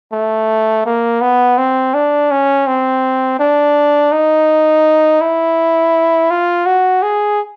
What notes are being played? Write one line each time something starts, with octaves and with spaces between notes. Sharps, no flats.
A3
A#3
B3
C4
D4
C#4
C4
D4
D#4
E4
F4
F#4
G#4